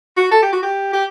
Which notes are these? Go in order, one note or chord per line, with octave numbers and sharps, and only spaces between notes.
F#4
A4
G4
F#4
G4
G4